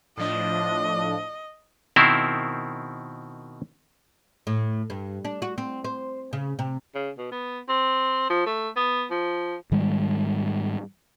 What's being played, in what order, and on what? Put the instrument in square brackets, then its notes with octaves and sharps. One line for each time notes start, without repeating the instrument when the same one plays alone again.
[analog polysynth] A2 F3 D4 [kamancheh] D#5
[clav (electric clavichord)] B2 D#3 C4 E4 A#4 C5
[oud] A2
G2
D4
F#4
C4
C5
C#3
C3
[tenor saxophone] C#3
B2
B3
C4
F3
A3
B3
F3
[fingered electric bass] G#2 D#3 G3 G#3